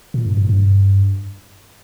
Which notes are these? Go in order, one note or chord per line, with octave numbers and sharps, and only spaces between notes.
A#2
G2
G2
G2